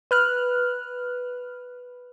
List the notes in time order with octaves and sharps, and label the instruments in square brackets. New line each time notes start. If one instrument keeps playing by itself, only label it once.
[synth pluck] B4 F6 F#6